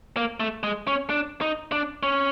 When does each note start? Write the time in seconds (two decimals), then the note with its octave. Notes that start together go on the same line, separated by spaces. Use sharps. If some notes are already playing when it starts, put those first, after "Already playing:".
0.17 A#3
0.40 A3
0.63 G#3
0.87 C#4
1.10 D4
1.41 D#4
1.72 D4
2.03 C#4